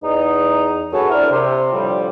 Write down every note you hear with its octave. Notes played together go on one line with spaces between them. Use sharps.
E2 D#4
F#2 F#4 G#4 A4 B4 C#5
C4 D4 E4 A#4
C3
A2 D3 F3 G3